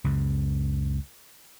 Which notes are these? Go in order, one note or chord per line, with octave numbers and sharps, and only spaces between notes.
C#2 F#2 C#3